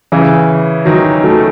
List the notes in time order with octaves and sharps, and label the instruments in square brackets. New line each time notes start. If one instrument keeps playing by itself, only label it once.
[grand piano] C#3 E3
D#3 F#3
F#3 A3